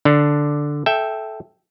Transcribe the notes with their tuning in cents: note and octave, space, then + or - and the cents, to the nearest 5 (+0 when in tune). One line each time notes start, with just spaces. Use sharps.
D3 +0 D4 +0
A4 -15 E5 +0 G5 +0